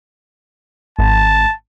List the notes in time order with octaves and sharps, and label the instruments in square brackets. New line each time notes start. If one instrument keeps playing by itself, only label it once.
[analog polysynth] G#1 [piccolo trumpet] A5